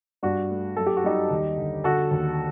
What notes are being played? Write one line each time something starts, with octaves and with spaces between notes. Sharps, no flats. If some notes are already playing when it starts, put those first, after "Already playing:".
G2 D4 F#4
A3
F#2 A4
G4
F#4
G3 D#4 G4
D#2
D3
D3 F#4 A4
D#2